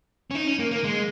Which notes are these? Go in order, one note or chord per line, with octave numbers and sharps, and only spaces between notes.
C#4
D#4
C#4
A#3
A#3
G#3